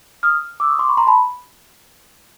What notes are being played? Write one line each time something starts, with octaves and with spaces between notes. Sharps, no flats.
D#6 F6
D6 E6
C#6 D#6
C6 D6
B5 C#6
A#5 C6
A5 B5